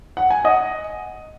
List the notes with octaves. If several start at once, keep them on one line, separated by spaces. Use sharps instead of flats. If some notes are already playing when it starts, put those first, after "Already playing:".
F#5
G#5
D#5 F#5